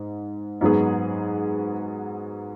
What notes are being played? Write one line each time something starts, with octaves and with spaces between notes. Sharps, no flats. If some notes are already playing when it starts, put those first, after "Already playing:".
Already playing: G#2
G#2 F#3 B3 G#4